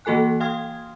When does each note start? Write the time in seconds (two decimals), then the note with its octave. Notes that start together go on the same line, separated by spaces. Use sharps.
0.05 E3 A#3 F#4 A4 G#5 F#6
0.40 F5 G5 C6 D#6 F6 G#6